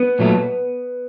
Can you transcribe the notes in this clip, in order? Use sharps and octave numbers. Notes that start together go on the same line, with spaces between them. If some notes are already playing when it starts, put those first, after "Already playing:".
Already playing: B3
A#2 F#3 A3